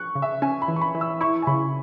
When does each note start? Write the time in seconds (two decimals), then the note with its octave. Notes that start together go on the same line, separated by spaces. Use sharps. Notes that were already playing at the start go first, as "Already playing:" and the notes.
Already playing: C#6 F#6
0.15 C#3
0.22 E5
0.42 C#4 G#5
0.62 B5
0.68 E3
0.76 C#6
0.81 B5
0.95 E3
1.01 E6
1.21 E4 C#6
1.42 G#5
1.47 C#3 B5